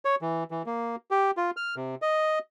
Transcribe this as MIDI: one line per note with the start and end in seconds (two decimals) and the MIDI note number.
0.05 0.15 73
0.22 0.44 52
0.51 0.62 52
0.66 0.96 58
1.11 1.31 67
1.37 1.51 65
1.57 1.75 89
1.76 1.95 48
2.02 2.39 75